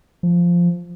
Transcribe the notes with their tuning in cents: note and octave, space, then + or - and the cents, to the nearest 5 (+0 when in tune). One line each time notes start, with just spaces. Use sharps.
F3 -5